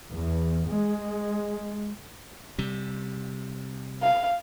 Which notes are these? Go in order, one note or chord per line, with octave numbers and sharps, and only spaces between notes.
E2
G#3
C3 G3
F5